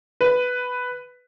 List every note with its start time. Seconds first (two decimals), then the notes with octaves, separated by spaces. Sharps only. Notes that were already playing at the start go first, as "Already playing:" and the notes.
0.21 B4